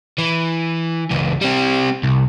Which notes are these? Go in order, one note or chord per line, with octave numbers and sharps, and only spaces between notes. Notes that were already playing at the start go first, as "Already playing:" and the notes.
E3
C#2 E3
G3 C4
C2